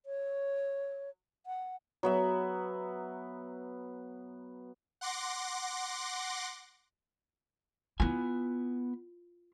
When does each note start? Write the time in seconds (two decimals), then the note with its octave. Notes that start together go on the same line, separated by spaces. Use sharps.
0.06 C#5
1.46 F#5
2.03 F#3 B3 E5
5.01 F#5 C6 D6 A#6
8.00 B3 E4 F4 G#5